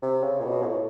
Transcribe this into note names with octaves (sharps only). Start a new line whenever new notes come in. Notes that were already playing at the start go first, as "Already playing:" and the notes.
C3
C#3
A#2
B2
A#2
A2